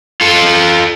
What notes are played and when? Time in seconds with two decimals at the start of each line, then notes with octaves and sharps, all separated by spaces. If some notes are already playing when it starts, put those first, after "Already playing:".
0.21 F4 A4